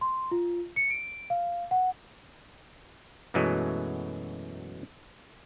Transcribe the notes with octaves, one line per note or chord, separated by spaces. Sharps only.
C6
F4
C#7
D7
F5
F#5
F#2 B2 E3 F#3 G#3 A3